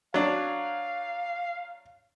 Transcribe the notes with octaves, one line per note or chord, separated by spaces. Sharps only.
F#3 D4 F5